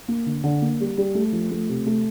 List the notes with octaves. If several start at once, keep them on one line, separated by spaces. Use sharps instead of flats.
A#3
D3
D3
A#3
G3
G3
A3
F3
A3
C3
A3